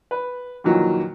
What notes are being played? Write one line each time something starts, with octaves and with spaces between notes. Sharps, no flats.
B4
F2 A#2 D#3 E3 F#3